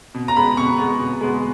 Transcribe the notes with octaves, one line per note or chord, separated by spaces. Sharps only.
B2
A#5
G#3 B3 B5
B2 C#6
G#3 B3
B2
G#3 B3